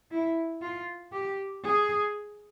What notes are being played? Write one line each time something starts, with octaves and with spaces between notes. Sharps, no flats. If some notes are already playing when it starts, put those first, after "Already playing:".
E4
F4
G4
G#4